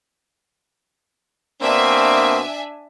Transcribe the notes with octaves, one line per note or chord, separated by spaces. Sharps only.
B2 A#3 C4 D4 E5 G#5